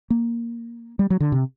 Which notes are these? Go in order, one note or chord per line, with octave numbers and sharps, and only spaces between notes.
A#3
G3
F#3
D3
C3